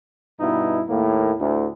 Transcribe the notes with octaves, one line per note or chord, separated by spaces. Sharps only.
G2 B2 D#4 E4
D#2 A2 A#3
D2 A2